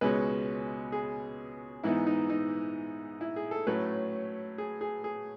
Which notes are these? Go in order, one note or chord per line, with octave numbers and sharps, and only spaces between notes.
C#2 B2 G#3 C#4 B4
G#4
G#2 E3 B3 D#4 E4
D#4
D#4
E4
G#4
A4
A2 F#3 A3 C#4 B4
G#4
G#4
G#4